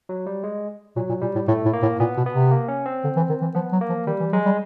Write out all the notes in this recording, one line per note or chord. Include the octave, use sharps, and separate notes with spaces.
F#3
G3
G#3
A#2 F#3
A#2
A#2 G3
A2
A2 A3
A2
A#3
A2
A#2 B3
B2
B3
C3
A#3
C#4
C4
D3
E3
D#3
E3
F3 B3
F#3
A#3
F3
D#3 G3
E3
F#3 G#3
G3